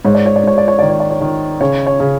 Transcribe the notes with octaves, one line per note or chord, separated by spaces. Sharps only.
G#2 C#5
D5
C#5
D5
G#2 C#5
D5
C#5
D#3 D5
C#5
D5
C#5
D#3
C#3 C#5
C#5
C#3